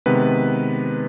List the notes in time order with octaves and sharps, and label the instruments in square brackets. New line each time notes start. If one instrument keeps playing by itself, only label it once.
[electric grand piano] C3 D#3 G#3 B3 B4